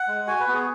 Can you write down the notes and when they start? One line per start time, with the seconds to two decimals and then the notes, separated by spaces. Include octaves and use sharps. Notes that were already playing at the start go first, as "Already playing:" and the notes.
Already playing: F#5
0.08 G#3
0.27 F#4 G#5
0.40 B4
0.48 B3 F#4
0.53 G#4